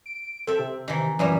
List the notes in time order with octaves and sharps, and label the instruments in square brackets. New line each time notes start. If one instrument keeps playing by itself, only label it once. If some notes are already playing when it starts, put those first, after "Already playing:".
[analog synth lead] D7
[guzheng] C4 E5 [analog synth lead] A4
[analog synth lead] C3
[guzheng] D#3 E3
[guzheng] F#2 A#2 G3 [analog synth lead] E3